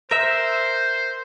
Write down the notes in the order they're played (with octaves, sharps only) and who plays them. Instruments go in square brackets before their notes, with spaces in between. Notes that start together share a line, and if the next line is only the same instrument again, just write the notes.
[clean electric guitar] A#4 E5 [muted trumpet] C5